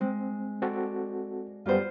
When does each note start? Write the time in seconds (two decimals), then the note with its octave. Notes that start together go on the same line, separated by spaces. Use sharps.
0.01 G#3 C4
0.62 C4 F#4 A4 D5
1.66 F#2 G3 B3 F4 C5